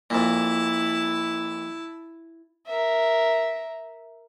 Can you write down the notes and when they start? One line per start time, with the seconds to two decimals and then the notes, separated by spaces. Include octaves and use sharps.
0.10 F2 A#2 E4 A5
2.66 A#4 E5